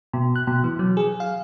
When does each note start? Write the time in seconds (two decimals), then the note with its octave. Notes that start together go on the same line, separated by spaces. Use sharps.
0.13 B2
0.36 F#6
0.47 B2
0.64 E3
0.79 F#3
0.97 G#4
1.20 F5